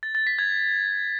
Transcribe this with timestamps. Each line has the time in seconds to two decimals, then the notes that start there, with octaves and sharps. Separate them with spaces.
0.03 A6
0.15 A6
0.27 B6
0.39 G#6